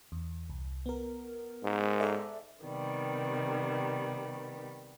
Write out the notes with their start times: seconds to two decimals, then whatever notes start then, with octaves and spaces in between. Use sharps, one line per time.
0.12 E2
0.50 C2
0.86 B3 A#4
1.64 G#2
2.00 A4 D5 E5
2.63 C3 D#3 G3 B3